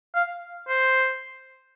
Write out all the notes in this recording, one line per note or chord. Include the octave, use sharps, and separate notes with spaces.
F5
C5